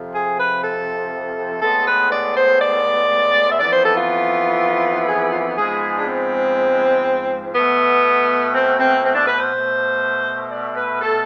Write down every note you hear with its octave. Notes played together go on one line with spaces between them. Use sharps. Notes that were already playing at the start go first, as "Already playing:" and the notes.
Already playing: F2 C3 F3
G#4
B4
A4
A2 G#3 B3 A4
B4
D5
C5
D5
E5
F2 E3 B3 D5
C5
A4
F4
F4
G#4
F4
G#2 F3 G#3 B3 G#4
D4
C4
B2 A3 B3
C4
C4
C4
D4
B4
C5
B2 A3
D5
B4
A4